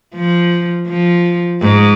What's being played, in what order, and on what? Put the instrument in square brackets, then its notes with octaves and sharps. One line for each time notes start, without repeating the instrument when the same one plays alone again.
[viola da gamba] F3
F3
G#2